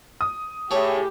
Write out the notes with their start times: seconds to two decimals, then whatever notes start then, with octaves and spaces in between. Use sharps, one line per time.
0.21 D#6
0.71 A2 A3 G4 G#4 C#5